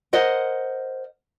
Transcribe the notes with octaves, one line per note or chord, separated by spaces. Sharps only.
A#4 C5 D#5 F#5